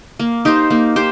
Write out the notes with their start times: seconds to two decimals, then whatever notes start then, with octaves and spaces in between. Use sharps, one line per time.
0.19 A#3
0.45 D#4 G4 C5
0.70 A#3
0.96 G4 C5